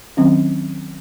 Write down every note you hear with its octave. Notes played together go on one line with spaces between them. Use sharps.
D#3 F#3 C4 C#4